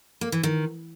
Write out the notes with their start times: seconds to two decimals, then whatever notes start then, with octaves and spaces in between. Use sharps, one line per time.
0.21 A#3
0.32 E3
0.43 D#3